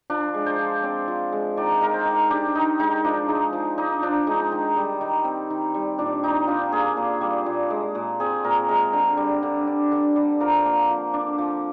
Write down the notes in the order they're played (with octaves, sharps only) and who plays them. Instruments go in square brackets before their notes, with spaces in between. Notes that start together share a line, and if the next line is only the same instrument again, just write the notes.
[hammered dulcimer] F3 D4
G#3
C5
F3
C4 D5
F3
G#3
D#3 D5
G#3 A#4
C5
D#3
D4 G4
D#3 D#4
G#3 D#4
F3 D4
G#3 D#4
F3
D4 D#4
F3 D4
G#3 D#4
D#3
G3
D#3
C4
D#3
G3
A#2 D4
G3 D#4
D4 F4
A#3 G#4
A#2
G3
A#2
G#3
A#2
C4 G#4
A#2 A#4
G#3 A#4
D3
G3
D3
D4
D3
G3
F3 A#4
A#3
F3
D4
F3